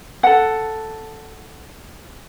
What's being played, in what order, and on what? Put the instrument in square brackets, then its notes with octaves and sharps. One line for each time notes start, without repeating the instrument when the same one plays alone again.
[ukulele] A4 F#5